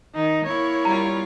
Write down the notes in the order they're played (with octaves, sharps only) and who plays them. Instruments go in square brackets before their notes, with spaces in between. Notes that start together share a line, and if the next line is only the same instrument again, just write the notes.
[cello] D#3 [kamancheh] D#4
[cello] A#3 E4 [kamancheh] C#5
[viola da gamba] G3 F4 [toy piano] A#5